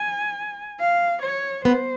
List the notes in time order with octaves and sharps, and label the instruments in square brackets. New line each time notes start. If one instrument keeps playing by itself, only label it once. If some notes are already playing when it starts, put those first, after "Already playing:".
Already playing: [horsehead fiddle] G#5
F5
C#5
[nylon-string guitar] B3 [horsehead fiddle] C5